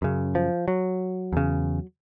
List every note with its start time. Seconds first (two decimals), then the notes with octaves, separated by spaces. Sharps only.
0.02 F#2 C#3
0.35 F3
0.68 F#3
1.33 E2 C#3